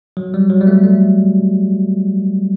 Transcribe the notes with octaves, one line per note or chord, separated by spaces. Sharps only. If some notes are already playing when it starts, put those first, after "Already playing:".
F#3
G3
F#3
G3
A3
A3